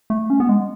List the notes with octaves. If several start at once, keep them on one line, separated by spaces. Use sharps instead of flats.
A3
C#4
B3
G#3